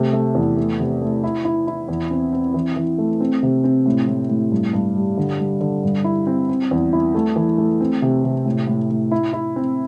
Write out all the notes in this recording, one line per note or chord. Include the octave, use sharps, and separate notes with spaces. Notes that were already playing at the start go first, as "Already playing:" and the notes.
Already playing: C3 A3
A3
E2
A3
C3
A3
E4
E4
E4
E2
C4
C4
E3
E3
A3
C4
C3
C4
A2
A2
A2
G2
G2
G3
D3
G3
D3
G2
E4
C4
C4
E2
E4
A3
E3
A3
C4
C3
C3
A2
A2
A2
E4
E4
C4